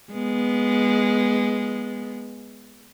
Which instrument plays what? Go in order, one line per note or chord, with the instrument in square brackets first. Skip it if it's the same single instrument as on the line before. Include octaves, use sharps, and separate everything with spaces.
[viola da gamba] G#3 B3